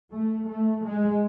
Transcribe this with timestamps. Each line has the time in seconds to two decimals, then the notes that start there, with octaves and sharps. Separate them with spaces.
0.11 A3
0.48 A3
0.84 G#3